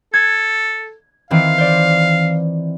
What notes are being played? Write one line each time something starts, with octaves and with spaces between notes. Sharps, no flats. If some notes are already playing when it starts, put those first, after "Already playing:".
A4 G#6
D#3 E3 C4 F5
C5 D5